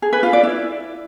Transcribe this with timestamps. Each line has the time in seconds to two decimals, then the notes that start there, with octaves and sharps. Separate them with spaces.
0.02 G#4
0.13 B4
0.23 F4
0.33 D5
0.43 E4